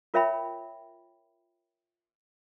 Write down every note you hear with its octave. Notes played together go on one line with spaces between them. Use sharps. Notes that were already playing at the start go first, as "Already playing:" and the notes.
F4 A#4 C#5 E5 G5 B5